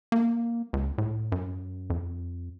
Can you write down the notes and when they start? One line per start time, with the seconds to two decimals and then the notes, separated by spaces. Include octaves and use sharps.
0.12 A#3
0.73 C#2
0.98 A2
1.32 F#2
1.90 F2